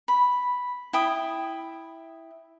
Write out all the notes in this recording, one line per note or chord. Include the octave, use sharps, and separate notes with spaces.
B5
E4 G5 D#6